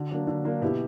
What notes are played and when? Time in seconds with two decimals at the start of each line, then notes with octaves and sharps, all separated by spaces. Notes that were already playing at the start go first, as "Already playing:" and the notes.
Already playing: D3 F#4
0.11 F#3 A#3 D4
0.27 D3
0.44 F#3 A#3 D4
0.61 B2 E4 G4